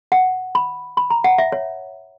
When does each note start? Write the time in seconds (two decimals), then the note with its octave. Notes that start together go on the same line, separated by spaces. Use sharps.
0.12 F#5
0.55 B5
0.97 B5
1.10 A#5
1.24 F#5
1.38 E5
1.52 C#5